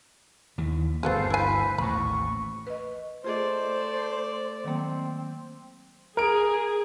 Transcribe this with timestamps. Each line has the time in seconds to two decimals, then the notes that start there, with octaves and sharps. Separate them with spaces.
0.58 D#2 E3
1.03 G1 D2 B3 F#4 G#4 A4 C5 F5
1.30 E4 B4 C5 G#5
1.78 A1 D#2 A2 B5 C#6
2.67 B4 D#5
3.24 A3 F4 G#4 C5 D5 D#5
4.64 D#3 F#3 A#3 C4
6.17 G#4 A#4 D7